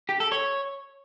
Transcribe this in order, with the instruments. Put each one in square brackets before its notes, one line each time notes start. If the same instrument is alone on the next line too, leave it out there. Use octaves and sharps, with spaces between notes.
[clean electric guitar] G4
A4
C#5